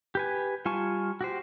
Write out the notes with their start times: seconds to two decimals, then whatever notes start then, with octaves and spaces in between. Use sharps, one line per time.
0.15 G4 B4 G#5
0.65 G3 F4 G#5 A5 C#6
1.21 F#4 G4 C5